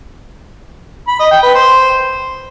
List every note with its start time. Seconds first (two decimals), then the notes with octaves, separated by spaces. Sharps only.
1.08 B5
1.19 D#5
1.31 G5
1.43 B4
1.55 C5